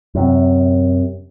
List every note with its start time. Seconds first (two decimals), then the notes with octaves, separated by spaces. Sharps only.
0.15 F#2 C3